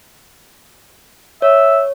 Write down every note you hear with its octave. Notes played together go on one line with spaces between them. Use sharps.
C#5 E5